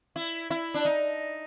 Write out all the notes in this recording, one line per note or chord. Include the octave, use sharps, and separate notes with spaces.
E4
E4
D4
D#4